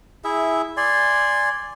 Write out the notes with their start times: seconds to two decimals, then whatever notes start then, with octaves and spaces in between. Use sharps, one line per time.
0.24 E4 G#4 E5
0.77 D5 G#5 C6